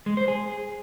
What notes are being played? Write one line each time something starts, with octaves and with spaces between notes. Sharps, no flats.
G#3
C5
G#4